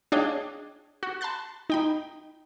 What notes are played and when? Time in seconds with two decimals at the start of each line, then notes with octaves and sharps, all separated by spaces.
0.12 D4 G#4 C#5 D#5 F5 G5
1.03 F#4
1.21 A5 B5 C6 F#6 A6
1.70 D#4 G5 B5